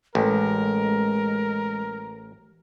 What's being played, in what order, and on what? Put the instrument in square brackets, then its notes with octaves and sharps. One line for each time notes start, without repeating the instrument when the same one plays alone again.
[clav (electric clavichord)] A1 [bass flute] G#3 [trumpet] A#4